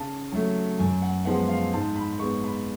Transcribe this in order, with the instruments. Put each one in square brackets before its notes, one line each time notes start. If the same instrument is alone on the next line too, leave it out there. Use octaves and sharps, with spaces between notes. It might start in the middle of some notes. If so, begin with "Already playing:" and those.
Already playing: [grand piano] C#3 A5
F#3 A3
F#2 G#5
F#5
F3 G#3 B3 F#5
F5
G#2 A5
B5
G#3 B3 C#6
B5